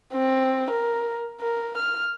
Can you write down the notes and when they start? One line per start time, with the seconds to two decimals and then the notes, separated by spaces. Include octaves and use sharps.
0.14 C4
0.71 A#4
1.41 A#4
1.78 F6